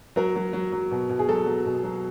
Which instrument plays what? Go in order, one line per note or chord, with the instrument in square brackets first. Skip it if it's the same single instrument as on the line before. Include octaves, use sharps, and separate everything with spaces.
[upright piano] F#3 A#4
F#3
F#3
F#3
B2
B2
G#4
F#3 A4
F#3
B2
F#3